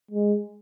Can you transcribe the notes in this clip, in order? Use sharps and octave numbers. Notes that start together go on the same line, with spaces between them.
G#3